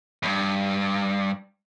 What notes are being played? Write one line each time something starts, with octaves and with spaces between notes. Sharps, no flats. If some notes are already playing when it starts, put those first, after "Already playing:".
E2 G2